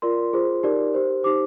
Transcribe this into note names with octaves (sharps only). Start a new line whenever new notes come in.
F4 A#4 D5 C6
F4 G#4 C5
D#4 G4 A#4 D5
G4 C5
D#4 G4 C5 D6